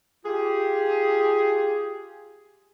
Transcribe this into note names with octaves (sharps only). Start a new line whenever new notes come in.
F4 G4 G#4